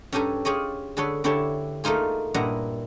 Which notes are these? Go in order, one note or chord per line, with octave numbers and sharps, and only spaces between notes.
G2 C#4 G4 A4 G#5 A#5
F4 G4 G#4 C#5 D#5
D3 G#4 A4 B4 C#5
D3 D4 E4 G4 C#5 A5
A3 A#3 D#4 F4 G#4
G2 A#2 E4 D#5 F#5 A#5